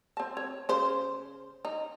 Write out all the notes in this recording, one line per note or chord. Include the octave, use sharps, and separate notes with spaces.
C4 A5
C#5
C#3 C5
D#4